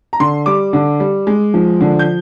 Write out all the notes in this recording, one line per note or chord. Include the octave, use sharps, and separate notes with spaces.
A#5
D3 C6
G3 D6
D3
G3
G#3
F3
D3
G6